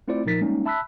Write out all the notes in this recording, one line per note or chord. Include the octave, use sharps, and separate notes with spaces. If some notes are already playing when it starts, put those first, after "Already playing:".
A3 C4 E4 F4 C5 D5
A#2 F3 D#4 A#4 A6 B6
G3 G#3 A#3 C#4 D#4
E5 A5 B5 E6 F#6 B6